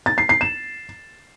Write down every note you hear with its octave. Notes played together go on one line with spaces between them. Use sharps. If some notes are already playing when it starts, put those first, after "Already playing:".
A6
C7
C7
E7